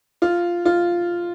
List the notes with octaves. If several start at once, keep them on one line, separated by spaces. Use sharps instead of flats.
F4
F4